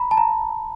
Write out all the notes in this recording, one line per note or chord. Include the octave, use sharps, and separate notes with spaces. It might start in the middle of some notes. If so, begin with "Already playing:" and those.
Already playing: A#5 B5
A5
A#5